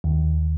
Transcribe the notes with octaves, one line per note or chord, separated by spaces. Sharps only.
D#2